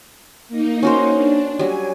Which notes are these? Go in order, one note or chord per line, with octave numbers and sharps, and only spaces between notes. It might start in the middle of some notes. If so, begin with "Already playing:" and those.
A#3 D#4
C#4 F#4 C5
D4
F#3 G3 G#5